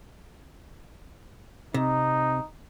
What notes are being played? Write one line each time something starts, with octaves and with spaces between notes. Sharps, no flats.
C3 D#4